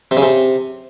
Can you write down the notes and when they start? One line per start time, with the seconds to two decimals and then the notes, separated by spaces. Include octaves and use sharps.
0.11 C3
0.17 C#3
0.22 C3